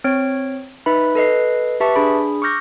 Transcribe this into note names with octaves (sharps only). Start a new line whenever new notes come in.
C4 C#5 D7
D#4 B4 E5 B5
A4 B4 D#5 C7
G4 B4 E5 A5 C#6
D4 G#4 B5
C#6 D6 E6 F6 G6 A#6